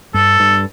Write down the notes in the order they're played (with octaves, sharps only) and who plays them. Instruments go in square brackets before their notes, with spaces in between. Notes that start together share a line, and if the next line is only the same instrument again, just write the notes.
[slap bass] G2 [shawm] A4
[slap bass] G2